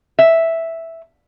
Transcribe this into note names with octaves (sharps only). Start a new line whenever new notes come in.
E5